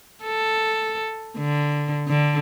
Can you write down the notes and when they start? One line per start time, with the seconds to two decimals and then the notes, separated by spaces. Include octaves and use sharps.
0.24 A4
1.37 D3
2.08 D3